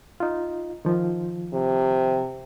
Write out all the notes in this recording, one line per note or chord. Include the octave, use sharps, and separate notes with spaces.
D#4 F4
D#3 F3
C3